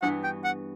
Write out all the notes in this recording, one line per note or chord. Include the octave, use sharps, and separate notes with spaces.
G2 E3 B3 F#4 F#5
G5
F#5